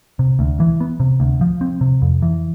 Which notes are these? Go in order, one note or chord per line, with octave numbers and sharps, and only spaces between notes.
C3
D2
E3
B3
C3
D2
F3
C4
C3
F2
E3